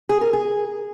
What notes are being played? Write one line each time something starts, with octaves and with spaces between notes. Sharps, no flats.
G#4
A#4
G#4